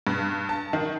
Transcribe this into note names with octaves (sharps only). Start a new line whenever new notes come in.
G2
A5
D#3